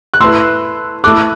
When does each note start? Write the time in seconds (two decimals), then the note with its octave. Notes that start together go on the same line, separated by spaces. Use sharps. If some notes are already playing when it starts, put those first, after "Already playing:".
0.14 F#6
0.20 A3 E4 B4 C6 E6
1.04 A3 E4 A4 D6 F#6